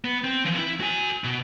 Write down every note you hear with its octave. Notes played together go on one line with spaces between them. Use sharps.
B3
C4
E3 F3
E4
F#4 G#5
B2